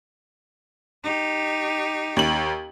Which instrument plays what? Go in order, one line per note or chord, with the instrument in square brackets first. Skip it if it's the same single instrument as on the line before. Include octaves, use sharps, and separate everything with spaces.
[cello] D#4 G4
[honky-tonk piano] D#2 F#7